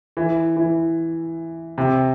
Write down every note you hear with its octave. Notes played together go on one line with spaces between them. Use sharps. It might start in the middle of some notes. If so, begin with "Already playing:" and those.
E3
E3
C3